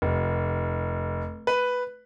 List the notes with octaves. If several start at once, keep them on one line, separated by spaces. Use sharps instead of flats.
F1
B4